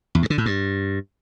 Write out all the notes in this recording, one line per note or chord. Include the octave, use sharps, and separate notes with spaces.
E2
G2
D3
A2
G2